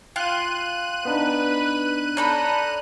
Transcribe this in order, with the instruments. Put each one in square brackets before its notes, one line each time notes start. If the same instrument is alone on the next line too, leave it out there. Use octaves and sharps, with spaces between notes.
[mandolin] F4 [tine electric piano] G5 [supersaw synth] F#6 D#7
[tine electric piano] B3 D4 D#4 [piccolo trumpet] B4
[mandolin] D4 A4 B5 [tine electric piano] C#5 D5 G6 [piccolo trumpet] A#5